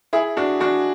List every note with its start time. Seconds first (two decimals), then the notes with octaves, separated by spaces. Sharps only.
0.13 E4 G#4
0.37 D4 F#4
0.60 D4 F#4